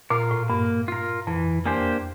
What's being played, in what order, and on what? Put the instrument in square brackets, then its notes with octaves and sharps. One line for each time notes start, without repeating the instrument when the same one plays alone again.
[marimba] A#2 [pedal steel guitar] F4 A#4
[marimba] A2
[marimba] G2 [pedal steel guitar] A#3
[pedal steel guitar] F4 A#4
[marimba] F2 [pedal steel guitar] E3
[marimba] E2 [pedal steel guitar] A#3 D4 G4 C5